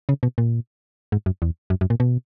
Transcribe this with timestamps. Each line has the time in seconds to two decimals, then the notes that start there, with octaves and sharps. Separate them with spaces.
0.09 C#3
0.23 B2
0.38 A#2
1.12 G#2
1.26 F#2
1.42 E2
1.70 F#2
1.81 F#2
1.90 A#2
2.00 B2